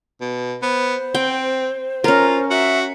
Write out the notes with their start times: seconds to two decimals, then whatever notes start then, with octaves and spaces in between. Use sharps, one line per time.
0.21 B2
0.62 B3 C5
1.14 C4 G5
2.04 C#4 F4 A#4
2.50 F#4 E5